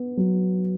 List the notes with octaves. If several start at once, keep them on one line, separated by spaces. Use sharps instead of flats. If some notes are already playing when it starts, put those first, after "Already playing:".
Already playing: B3
F#3